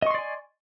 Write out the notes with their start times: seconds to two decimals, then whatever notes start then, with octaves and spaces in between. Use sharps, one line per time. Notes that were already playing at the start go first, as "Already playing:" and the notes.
0.02 D#5
0.06 C#6
0.10 C6
0.14 D5
0.19 G#5